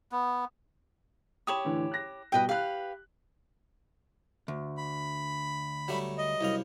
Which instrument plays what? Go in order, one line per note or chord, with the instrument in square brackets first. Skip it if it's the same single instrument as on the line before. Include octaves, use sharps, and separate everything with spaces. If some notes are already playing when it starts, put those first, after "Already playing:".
[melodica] B3
[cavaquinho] G4 C#5 B5 [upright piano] D#6 E7
[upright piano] A2 D3 E3
F#6 A#6
[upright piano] B2 G3 [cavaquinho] B4 D#5 G5
[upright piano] G4 F#6 [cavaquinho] B4 F5
[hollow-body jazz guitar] D2
[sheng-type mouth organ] B5
[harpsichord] F#3 G3 A3
[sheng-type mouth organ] D#5
[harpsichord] C2 F#2 F5